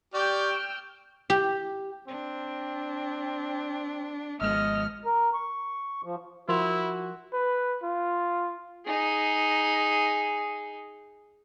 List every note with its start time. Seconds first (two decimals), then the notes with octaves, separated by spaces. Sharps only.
0.14 G4 D5 G5 C#6 E6 F6
1.30 G4
2.08 C4 D4
4.41 G#1 F3 G#3 B3 D#5 F6
5.05 A#4
5.34 C#6
6.04 F3
6.49 F3 E4 F#4 A#4 C6 F7
7.33 B4
7.83 F4
8.86 D#4 G#4